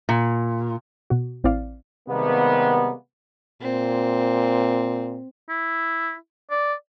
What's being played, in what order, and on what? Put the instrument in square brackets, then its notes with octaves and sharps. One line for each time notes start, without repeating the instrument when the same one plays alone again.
[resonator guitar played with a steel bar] A#2
[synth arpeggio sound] B2 F#4
A1 C4 E4 D5 F5
[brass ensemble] C3 D#3 G3 G#3 A#3 B3
[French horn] A#2 [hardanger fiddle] C4
[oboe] E4
D5